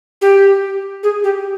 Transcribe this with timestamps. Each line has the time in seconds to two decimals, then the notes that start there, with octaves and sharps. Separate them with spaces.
0.22 G4
1.03 G#4
1.24 G4